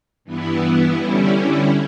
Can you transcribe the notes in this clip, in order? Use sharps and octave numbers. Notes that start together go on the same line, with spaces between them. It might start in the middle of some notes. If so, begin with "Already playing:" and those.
G2 E3 B3 E4
D3 G3 C#4 E4